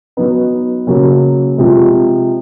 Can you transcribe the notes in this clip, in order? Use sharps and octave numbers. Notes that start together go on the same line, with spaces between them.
F#3 B3 D#4
C#3 F#3 A#3 C#4
C3 F3 G#3